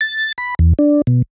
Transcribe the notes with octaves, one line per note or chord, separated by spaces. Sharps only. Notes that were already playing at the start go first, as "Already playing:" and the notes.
A6
B5
E2
D4
B2